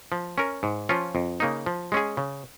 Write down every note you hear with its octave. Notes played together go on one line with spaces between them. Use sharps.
F3
C#4 A#4
G#2
F3 C#4 F4
F2
C#3 A#3 D#4
F3
G#3 C#4 G#4
C#3